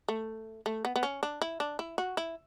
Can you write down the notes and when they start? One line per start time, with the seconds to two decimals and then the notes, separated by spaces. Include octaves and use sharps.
0.09 A3
0.66 A3
0.85 B3
0.96 B3
1.03 C#4
1.23 D4
1.42 E4
1.60 D4
1.79 E4
1.98 F#4
2.17 E4